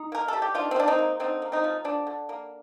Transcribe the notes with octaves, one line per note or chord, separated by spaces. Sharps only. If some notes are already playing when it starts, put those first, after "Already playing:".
Already playing: D#4
A#3 A#4
G3 A4
G4
D#3 D4 F4
C4
D#3 D4
C4 D#4
A#3
D3 C4 D#4
A#3
C4 D#4
F3
D3 D4
D3
A#3